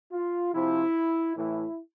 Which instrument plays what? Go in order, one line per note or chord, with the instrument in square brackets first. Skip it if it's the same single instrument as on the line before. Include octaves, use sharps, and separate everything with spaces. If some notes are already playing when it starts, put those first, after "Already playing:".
[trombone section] F4
C3 F3 C4 E4
A2 E3 A3 E4